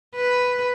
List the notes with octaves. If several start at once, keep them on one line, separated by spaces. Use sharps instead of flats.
B4